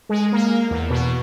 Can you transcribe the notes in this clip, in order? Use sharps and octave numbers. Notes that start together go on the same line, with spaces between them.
G#3
A#3
E2
B2